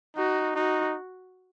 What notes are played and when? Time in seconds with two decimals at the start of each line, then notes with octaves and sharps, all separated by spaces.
0.16 D#4 F#4
0.56 D#4 F#4